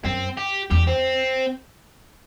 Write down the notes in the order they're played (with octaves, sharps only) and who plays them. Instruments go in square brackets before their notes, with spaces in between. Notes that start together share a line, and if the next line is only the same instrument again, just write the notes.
[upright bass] F#2 [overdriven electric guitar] C4
[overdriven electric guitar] G4
[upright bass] E2 [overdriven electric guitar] G4
[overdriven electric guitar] C4